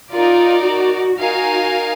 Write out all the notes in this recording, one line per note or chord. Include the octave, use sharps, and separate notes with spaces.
D#4 F4 A#4 D5
F#4
D#4 F#4 A#4 F5 G#5